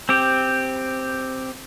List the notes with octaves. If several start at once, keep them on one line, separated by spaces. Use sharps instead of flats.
C4 G4